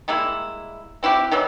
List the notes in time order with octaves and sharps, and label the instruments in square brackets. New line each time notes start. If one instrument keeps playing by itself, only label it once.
[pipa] G3 G#3 A#3 E4
C4 E4 F#4 G4
D#3 E3 F#3 G3